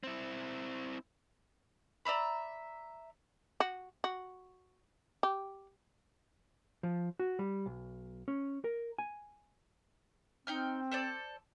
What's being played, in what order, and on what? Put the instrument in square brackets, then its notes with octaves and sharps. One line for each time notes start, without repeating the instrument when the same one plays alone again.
[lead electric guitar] C4 E4
[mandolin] D5 E5 A#5 B5
[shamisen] F#4
F#4
G4
[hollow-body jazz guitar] F3
F#4
G3
B1
C#4
A#4
G#5
[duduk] C4 [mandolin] D#4 G5 F6
[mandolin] A4 C5 D5